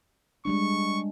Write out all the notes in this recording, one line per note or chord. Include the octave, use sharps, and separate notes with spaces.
G3 G#3 D4 C#6